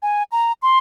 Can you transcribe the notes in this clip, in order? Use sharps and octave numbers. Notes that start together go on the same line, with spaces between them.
G#5
A#5
C6